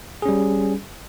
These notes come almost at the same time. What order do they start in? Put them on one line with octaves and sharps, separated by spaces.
G#4 C#4 G3